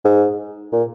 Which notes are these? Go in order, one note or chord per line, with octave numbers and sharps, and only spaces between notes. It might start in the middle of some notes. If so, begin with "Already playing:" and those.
G#2
A#2